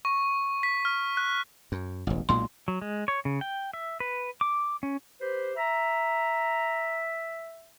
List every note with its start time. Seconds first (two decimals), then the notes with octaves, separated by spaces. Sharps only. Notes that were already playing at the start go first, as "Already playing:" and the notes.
0.05 C#6
0.63 B6
0.85 F6
1.17 F#6
1.72 F#2
2.07 E1 A1
2.29 B1 A#2 G#3 C6
2.68 F#3
2.82 G#3
3.08 C#5
3.25 C#3
3.41 G5
3.73 E5
4.00 B4
4.41 D6
4.83 C#4
5.20 G4 B4 C5
5.56 E5 A#5